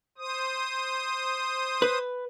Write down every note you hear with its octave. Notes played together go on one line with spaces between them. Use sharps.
C5 D#6
B4